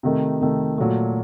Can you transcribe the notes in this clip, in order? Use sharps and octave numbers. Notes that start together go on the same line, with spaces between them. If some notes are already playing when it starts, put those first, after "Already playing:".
C3 D#3 A3 D#4
C3 D#3 A3 D#4
A#2 F#3 A3